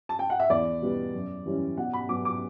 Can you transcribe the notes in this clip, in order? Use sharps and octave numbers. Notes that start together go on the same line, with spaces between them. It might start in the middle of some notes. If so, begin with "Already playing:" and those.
A5
G5
F#5
E5
E2 D5
B2 G3 B3
F#2
E3 G3 C#4
B2 F#5
B5
F#3 B3 D6
D6